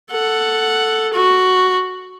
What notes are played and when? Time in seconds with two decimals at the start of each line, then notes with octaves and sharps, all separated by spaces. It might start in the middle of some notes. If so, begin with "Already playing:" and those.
0.12 A4 F#5
1.14 F#4